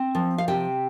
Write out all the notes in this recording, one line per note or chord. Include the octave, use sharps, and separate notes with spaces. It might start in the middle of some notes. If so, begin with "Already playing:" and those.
Already playing: C4
F3
F5
C3 G5